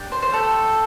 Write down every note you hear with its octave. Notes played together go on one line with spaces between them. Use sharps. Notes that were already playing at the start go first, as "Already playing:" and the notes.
Already playing: D4 G4
C5
C5
A3 D4 G4 A4